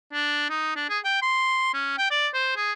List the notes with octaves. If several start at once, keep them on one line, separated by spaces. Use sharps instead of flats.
D4
D#4
D4
G#4
G5
C6
C#4
G5
D5
C5
G#4